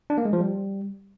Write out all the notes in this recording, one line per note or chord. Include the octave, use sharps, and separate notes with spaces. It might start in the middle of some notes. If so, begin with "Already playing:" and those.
D4
A#3
G#3
F3
G3